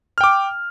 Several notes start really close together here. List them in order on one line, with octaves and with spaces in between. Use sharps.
F6 G5 D6